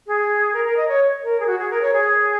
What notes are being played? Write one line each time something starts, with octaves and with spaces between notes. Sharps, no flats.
G#4
A#4
A#4
D#5
C#5
A#4
G#4
F#4
G#4
A#4
C#5
G#4